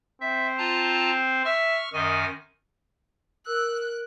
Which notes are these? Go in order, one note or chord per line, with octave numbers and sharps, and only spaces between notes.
C4 E5
F4 A5 A#5
E5 C#6 F6
F#2 D#3 D#5 G#5
A#4 E6 F#6